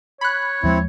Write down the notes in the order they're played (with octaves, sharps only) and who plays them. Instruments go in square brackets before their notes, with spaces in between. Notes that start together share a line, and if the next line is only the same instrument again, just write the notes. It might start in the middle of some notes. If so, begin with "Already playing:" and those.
[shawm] C#5 [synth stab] B5 F#6
[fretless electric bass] D#2 F3 G#3 [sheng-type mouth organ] C4 E4